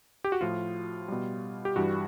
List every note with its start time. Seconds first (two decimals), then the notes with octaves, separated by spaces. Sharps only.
0.24 G4
0.32 F#4
0.41 A2 F3 F4
1.08 B2 G3
1.65 G4
1.76 G2 E3 G3 F#4